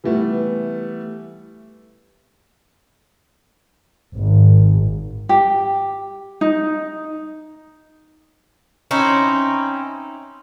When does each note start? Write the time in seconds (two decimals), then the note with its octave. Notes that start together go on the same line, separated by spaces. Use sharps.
0.04 E3 G3 A3 B3
4.17 G#1
5.29 G4
6.41 D#4
8.91 C4 C#4 D#4 E4